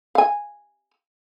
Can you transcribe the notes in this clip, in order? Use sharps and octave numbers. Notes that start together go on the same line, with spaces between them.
F5 G#5